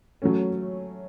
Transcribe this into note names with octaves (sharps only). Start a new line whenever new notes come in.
F#3 A3 C#4